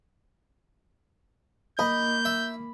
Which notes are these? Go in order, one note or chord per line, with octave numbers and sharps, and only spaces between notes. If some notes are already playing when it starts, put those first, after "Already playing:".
A#3 D#5 B5 G6
E5